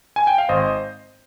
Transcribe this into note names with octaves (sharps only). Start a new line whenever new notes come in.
G#5
G5
F5
G#1 C5 D#5